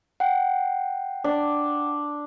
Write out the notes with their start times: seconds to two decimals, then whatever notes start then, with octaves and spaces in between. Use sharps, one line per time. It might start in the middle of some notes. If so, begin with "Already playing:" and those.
0.20 F#5 G5
1.24 D4